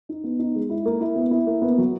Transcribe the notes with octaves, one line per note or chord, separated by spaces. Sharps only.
D#4
B3
D#4
G#3
E4
A#3
E4
B3
E4
A#3
B3
F#3